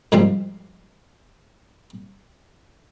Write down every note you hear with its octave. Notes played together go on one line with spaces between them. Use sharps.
G#2 C#3 F3 G3 F4